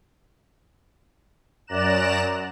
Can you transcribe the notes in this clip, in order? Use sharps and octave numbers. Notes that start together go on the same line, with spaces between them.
F#2 D5 A#5 F#6 E7